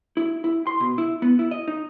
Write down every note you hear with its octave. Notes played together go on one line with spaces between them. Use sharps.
E4
E4
C6
B2
E4
B3
E4
D#5
D#4